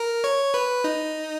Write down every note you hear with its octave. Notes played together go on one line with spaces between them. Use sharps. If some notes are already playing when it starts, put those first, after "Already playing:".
Already playing: A#4
C#5
B4
D#4